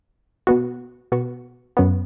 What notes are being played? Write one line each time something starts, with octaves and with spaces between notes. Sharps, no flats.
B2 B3 F#4
B2 B3 F#4
F#2 F#3 B3